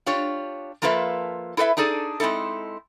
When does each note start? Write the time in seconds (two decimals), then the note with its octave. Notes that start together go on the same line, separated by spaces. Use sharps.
0.06 D4 F4 G4 C#5
0.82 F3 A#3 F4 A4 B4 E5
1.57 E4 A4 B4 D#5 E5
1.77 D4 D#4 G#4 A4 D5
2.20 G#3 C4 D#4 E4 A4